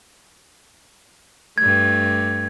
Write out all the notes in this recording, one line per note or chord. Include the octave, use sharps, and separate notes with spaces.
G2 A3 G#6